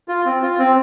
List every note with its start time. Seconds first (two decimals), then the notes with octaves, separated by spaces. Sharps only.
0.08 F4
0.25 C4
0.42 F4
0.59 C4